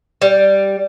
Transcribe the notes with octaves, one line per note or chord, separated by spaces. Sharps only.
G3